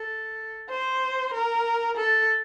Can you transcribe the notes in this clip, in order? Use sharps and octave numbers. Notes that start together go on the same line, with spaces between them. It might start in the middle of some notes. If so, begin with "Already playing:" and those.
Already playing: A4
C5
A#4
A4